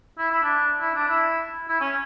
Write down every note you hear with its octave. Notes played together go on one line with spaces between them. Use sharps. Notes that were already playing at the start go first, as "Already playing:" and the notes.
E4
E4
D4
E4
D4
E4
E4
C#4